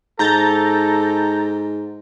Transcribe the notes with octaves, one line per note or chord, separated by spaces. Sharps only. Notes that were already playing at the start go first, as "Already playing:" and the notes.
G#2 A4 A#5 G6 A6